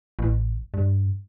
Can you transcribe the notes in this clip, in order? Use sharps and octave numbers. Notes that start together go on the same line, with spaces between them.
A1
G2